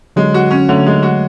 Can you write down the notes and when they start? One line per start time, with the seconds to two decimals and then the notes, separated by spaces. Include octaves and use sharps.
0.16 D3 F#3 G#3
0.34 F#4
0.51 C#4
0.69 D3 F#3 A3
0.87 G#3
1.03 F#4